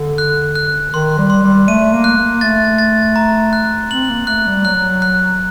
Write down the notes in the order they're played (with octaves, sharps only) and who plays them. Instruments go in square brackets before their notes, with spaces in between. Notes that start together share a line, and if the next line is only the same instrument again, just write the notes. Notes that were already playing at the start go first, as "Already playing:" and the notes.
Already playing: [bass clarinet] D3
[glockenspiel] F#6
F#6
[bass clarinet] D#3 [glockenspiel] C6
[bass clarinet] G3
[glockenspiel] C6
[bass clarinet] G3
[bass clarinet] A3 [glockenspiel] D#7
[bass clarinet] A#3
[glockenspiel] F#6
[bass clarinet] A#3
[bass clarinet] A3 [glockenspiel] A6
[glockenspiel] A6
A#5
F#6
[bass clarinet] C4 [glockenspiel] F#7
[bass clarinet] A#3
[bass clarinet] A3 [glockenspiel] F#6
[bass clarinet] G3
[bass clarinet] F#3 [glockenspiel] F#6
[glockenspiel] F#6